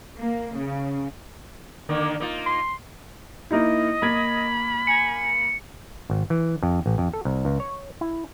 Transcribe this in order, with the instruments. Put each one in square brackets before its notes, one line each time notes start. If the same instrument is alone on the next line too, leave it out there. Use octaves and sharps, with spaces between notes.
[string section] A#3
C#3
[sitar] D3 D#3 A#3
A#3 D#4 F4
[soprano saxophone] C6
[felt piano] A#3 D#4 E4 [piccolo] D#5
[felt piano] A#3 G#6 [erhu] B5
[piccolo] G#5 [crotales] C#7
[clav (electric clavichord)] G#1
E3
F2
A1
F2
A4
C2
C#2
C#5
E4